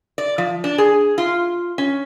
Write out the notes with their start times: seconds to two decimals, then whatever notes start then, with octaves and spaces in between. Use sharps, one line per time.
0.18 D5
0.38 F3
0.64 D4
0.78 G#4
1.18 F4
1.78 C#4